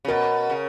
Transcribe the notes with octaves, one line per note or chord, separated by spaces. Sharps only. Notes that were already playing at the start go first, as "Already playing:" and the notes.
C#3
B2 A#4
C#3